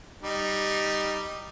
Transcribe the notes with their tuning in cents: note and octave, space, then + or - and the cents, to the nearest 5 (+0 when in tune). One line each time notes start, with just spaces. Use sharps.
G3 +0 D#4 -10